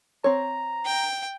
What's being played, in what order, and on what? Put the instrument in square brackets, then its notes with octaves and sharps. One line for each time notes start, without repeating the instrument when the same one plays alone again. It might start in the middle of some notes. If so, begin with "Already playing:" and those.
[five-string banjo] C4 C#5 [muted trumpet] A#5
[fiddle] G5